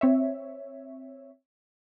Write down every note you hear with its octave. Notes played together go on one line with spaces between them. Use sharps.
C4 C#5 E5